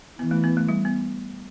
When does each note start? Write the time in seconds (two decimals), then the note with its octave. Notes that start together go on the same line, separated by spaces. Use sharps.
0.19 E3 B3
0.31 A3
0.44 B3
0.57 A3
0.69 G3
0.85 B3